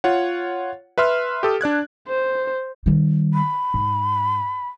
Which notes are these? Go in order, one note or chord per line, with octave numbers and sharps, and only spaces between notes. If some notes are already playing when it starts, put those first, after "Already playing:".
F4 C#5 F#5
B4 E5 C6 F6
G4 A4 D#6
D4 D5 F#6 G#6
C5
D#3 G3
B5
G#2